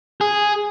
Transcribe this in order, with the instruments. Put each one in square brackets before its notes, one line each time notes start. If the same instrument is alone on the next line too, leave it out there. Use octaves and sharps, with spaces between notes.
[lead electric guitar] G#4